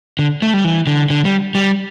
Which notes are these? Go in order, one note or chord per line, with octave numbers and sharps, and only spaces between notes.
D3
A3
G3
E3
D3
D3
G3
G3